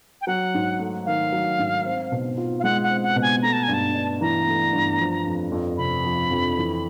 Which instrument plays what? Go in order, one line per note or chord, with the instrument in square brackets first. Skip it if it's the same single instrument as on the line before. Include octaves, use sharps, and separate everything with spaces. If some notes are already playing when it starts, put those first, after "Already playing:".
[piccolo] G5
[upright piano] F#3 [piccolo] F#5
[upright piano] G#2
A3
[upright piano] D#3 [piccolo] F5
[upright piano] F#3
G#2
C4
B2
F4
[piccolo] F5
[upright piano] G#3 [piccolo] F#5
[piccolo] F#5
[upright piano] C4
[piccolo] F#5
[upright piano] B2
[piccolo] G#5
[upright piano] A3 [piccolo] A#5
[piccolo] A5
G#5
[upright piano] G2
[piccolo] A5
[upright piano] D4
[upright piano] E3 [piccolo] A#5
[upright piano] A3
G2
F3
F2
F2
[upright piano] C3 [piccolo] B5
[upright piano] F3
F2
E3